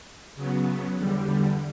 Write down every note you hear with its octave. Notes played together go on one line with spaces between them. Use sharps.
C#3 F#3 B3
E2 D3 G3